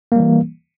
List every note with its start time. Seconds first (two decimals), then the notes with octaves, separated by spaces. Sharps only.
0.12 A#3
0.16 G3
0.20 E3